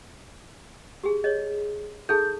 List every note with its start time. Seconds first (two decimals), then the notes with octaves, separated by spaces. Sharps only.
1.04 G4 G#4
1.24 G#4 C#5 D#5
2.09 D#4 G#4 A4 G6